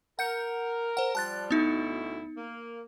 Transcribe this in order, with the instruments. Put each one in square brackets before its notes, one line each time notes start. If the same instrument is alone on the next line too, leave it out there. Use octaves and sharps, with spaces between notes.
[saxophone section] A#4 [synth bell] F#5 G6 C#7
[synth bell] C5 F#5
[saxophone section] F3 G3 [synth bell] A5 F#6 A6
[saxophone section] D2 B2 E4 [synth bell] B3 D#4
[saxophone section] A#3